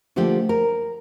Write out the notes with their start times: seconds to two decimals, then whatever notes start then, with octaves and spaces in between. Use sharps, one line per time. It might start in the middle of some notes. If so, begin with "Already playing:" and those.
0.16 D3 F3 A3 A#3 G4
0.49 A#4